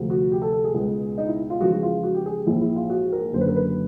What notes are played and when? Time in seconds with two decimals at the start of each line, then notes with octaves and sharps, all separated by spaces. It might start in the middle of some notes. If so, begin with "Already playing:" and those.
Already playing: D2 C3 F3
0.10 F#4
0.32 G4
0.42 A4
0.53 A4
0.64 G#4
0.74 C#2 B2 G#3 B3
1.18 D#4
1.28 E4
1.50 F4
1.61 E2 C#3 F3 G#3 B3 F#4
1.72 F#4
1.83 F4
2.03 F#4
2.14 G4
2.26 G#4
2.36 G4
2.47 A#1 G#2 E3 G#3 E4
2.61 E4
2.76 F4
2.90 F#4
3.12 A#4
3.33 F#1 F#2 D3 C5
3.41 B4
3.48 A#4
3.56 B4